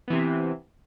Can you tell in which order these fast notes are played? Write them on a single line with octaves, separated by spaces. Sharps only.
B3 E3 C3 C4